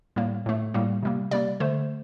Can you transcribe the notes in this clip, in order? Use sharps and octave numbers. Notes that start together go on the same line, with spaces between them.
A2 G3 A#3
A2 A3
A2 G3 A#3
C3 G3 A#3
C3 G3 A#3 D5
D3 A3 C5